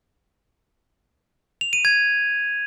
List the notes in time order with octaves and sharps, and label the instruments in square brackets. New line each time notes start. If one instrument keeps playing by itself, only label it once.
[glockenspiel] F7
D#7
G#6